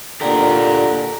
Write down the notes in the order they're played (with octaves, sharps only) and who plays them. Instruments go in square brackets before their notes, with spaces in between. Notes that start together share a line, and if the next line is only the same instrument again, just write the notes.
[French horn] A#2 [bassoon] D3 [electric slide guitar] G4 A#4